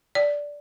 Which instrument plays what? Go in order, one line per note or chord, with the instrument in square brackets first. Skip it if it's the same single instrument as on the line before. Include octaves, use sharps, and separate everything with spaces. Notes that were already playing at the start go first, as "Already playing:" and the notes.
[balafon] D5